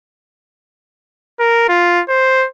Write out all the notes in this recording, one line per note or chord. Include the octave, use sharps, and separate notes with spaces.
A#4
F4
C5